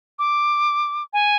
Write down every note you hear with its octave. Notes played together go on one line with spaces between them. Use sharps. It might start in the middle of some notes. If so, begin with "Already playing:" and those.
D6
G#5